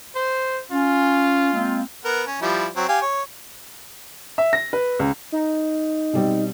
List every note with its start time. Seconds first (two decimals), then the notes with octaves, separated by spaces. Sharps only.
0.15 C5
0.72 C#4 F4
1.54 G#3 A#3 C4
2.05 B3 A#4 F#5
2.27 C#4
2.42 F3 G3 E4
2.76 F#3 C4 C#5
2.89 G4 F5 G#5
3.02 C#5
4.38 E5
4.53 A#6
4.73 B4
4.99 C#2
5.32 D#4
6.13 B2 G3 C4